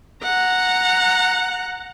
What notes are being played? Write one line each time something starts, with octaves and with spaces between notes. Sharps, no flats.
F#5 A#5